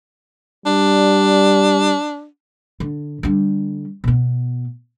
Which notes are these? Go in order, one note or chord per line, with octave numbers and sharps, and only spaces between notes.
G3 D4
D3
D3 G3
B2 B3